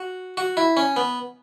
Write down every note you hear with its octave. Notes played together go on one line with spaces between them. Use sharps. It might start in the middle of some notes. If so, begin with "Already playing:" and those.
Already playing: F#4
F#4
E4
C#4
B3